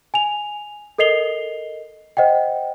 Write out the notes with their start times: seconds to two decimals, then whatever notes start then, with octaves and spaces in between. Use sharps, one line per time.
0.14 G#5 F7
0.98 A4 A#4 D#5 C7 F7 G7
2.17 C5 D#5 F#5 G5